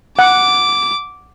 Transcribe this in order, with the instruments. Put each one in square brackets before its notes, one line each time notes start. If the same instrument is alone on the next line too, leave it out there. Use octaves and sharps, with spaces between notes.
[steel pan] F#5 [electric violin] D6